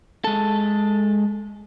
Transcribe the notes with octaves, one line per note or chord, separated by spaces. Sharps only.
G#3 A4